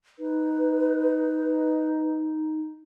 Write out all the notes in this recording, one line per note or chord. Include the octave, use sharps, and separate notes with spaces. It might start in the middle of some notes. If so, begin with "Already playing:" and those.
D#4 B4